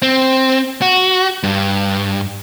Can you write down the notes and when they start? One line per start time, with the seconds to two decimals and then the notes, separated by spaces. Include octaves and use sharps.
0.02 C4
0.82 F#4
1.43 G2